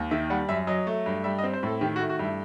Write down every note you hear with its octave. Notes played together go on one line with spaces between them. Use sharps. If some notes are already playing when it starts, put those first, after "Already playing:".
Already playing: D#2
D#3 E5
G3 F#5
F#2 E5
F#3 D#5
A3
G2
G3 E5
D#5
C4
C5
A2 A4
D#3 G4
F#4
A3
F#4
G2 E4